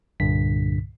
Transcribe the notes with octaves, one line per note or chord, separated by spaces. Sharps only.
C2 G2 A#2 D3 B6